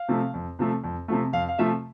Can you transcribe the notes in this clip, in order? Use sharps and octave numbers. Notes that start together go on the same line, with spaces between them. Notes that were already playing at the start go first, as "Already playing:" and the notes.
Already playing: F5
C3 F3 A3
F2
C3 F3 A3
F2
C3 F3 A3
F2 F5
F5
C3 F3 A3 E5